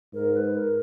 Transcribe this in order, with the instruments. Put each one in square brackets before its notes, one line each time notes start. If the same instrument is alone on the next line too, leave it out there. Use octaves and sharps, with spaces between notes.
[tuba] G#2 [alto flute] A#4
[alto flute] B4
A#4